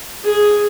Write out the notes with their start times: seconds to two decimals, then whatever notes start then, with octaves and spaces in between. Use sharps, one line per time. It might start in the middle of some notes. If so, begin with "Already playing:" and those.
0.24 G#4